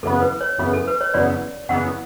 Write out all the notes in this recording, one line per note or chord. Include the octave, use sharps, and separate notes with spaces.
F#2 C#3 E3 B3 A4
B4
C#5
F#2 C#3 E3 B3
A4
B4
C#5
F#2 C#3 E3 B3 D5
F#2 C#3 E3 B3 F#5